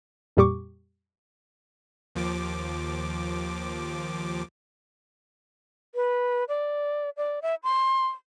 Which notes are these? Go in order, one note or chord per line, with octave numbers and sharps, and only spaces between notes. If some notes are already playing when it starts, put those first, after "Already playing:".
F2 A#2 G3 G4 C#6 D6
D#2 F3 D6
B4
D5
D5
E5
C6